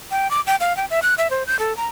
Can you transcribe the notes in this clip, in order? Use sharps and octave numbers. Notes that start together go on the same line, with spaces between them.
G5
D6
G5
F5
G5
E5
F#6
E5
C5
G6
A4
A#5